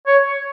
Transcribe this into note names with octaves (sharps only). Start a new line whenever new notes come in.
C#5